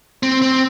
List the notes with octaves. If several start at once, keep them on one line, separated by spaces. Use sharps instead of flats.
C4
C4